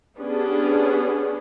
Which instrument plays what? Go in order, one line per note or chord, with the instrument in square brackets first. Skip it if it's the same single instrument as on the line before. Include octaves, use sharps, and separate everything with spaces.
[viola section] B3 C#4 D4 G4 G#4